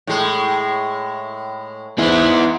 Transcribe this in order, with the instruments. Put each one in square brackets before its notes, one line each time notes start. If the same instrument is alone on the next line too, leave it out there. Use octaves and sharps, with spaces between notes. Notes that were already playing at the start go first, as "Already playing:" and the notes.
[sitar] A2 G#3
[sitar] G#2 G#3 [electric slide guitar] B3 E4